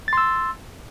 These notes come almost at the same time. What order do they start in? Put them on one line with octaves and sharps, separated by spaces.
A6 C6 E6